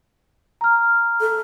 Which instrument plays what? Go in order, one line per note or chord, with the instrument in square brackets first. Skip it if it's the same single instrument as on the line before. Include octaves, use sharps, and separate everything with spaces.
[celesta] A#5 F6
[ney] A4